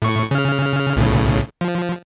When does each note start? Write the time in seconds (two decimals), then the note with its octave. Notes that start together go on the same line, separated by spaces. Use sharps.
0.02 A2 C#6
0.31 C#3 F6
0.96 B1 A2 C#3
1.61 F3